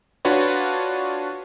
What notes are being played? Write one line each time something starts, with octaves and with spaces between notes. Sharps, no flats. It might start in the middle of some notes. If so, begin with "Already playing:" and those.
D4 F4 F#4 B4 C#5